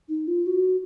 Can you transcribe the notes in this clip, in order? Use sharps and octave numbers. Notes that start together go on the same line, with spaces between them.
D#4
F4
F#4